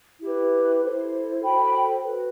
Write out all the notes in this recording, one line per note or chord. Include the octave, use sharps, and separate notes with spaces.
E4 G4 B4
E4 A4 C5
F#4 A4 C5 G5 B5
F#4 B4